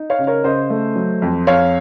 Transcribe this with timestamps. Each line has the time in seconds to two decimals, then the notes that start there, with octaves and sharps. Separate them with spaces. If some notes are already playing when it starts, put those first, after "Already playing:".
Already playing: D#4
0.10 C#5 F5
0.19 C#3
0.27 A#4 C#5
0.44 C#3 C5 D#5
0.70 A3
0.96 F#3
1.22 F2
1.47 F2 C#5 F5